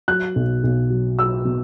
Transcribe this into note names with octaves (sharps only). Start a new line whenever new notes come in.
F#3 F#6
B1
B1
F#3
F#3 E6
B2